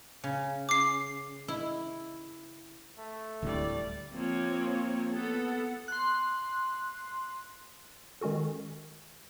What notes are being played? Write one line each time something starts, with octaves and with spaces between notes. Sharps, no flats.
C#3
D6 C7
E4
A3
D1 A2 D3 G3 D5
F3 A#3 C4 C#5
B3 A4 F#5
C6 F#6
D#3 G#3 C#4 F#4 A4